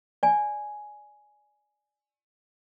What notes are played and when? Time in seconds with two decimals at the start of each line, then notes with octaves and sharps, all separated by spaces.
0.23 D5 G#5